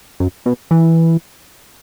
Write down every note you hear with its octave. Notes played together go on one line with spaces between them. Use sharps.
F#2
B2
E3